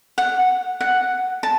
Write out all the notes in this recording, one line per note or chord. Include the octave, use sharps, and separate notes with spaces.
F#5
F#5
A5